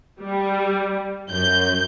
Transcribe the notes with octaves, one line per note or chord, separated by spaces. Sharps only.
G3
F#2 G6